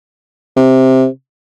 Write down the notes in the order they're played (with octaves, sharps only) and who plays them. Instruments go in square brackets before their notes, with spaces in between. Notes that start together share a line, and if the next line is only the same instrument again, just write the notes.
[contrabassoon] C3